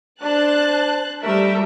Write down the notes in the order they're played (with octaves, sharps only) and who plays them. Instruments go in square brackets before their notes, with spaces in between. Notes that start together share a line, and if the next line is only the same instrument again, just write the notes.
[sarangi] D4 [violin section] C5 A5 F#6
[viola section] G3 A#4 [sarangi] A3 [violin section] E5